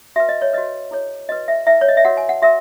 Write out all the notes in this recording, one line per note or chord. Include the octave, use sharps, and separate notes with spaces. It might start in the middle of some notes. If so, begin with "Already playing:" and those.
F#4 B4 E5
D#5
C#5
F#4 B4 D#5
E4 G#4 C#5
F#4 B4 D#5
E5
E4 B4 E5
C#5
D#5
E5
F#4 A#4 C#5 F#5
G#5
F#5
F#4 A#4 E5